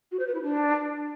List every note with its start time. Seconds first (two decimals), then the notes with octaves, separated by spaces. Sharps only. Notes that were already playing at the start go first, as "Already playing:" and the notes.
0.11 F#4
0.19 C5
0.27 B4
0.34 E4
0.42 D4